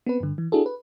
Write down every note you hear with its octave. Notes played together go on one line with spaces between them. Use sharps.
B3 C4 B4
G2 D3
E3
D4 E4 F#4 G#4 A4
B4